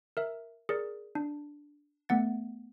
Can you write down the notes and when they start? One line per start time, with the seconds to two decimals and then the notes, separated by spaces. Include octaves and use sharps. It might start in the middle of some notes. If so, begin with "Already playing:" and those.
0.17 A#4 E5
0.69 G#4 A#4 D5
1.15 D4
2.09 A3 B3 F#5 A6